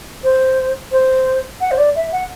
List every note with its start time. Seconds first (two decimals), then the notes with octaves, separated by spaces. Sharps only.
0.24 C5
0.92 C5
1.61 F#5
1.71 C5
1.78 D5
1.96 E5
2.12 F#5